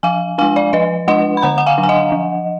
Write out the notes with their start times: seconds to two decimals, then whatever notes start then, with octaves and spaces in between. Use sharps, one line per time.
0.03 F3 F5 G#5
0.38 G#3 D4 F5 G#5
0.56 D5 F5
0.73 F3 B4 D#5
1.08 G#3 D4 D#5 F#5
1.37 B5
1.42 D3 F#5 A#5
1.58 F#5
1.66 F5 G#5
1.78 F#3 D4
1.83 G#5
1.89 D#5 F#5
2.12 F3